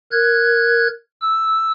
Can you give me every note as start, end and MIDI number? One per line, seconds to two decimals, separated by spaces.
0.12 0.88 70
0.12 0.88 90
0.12 0.88 92
1.21 1.72 88